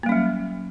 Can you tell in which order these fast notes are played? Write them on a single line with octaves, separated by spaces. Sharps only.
A#3 G3 C#4 F#3